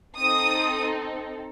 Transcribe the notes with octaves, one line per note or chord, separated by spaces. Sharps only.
C4 D#4 A4 D#6